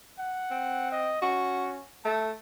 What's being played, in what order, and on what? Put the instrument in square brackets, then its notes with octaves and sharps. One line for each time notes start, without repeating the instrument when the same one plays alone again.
[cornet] F#5
[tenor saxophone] C4
[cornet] D#5
[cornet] C#4 [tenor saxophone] F#4
[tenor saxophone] A3 [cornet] A5